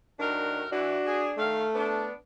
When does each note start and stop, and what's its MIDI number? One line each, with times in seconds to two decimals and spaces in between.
0.19 0.66 45
0.19 0.66 51
0.19 0.62 62
0.19 0.66 66
0.19 0.66 70
0.72 0.97 52
0.72 1.47 62
0.72 1.26 66
1.05 1.31 68
1.38 1.64 51
1.38 2.11 57
1.38 1.64 77
1.75 2.14 59
1.75 2.11 62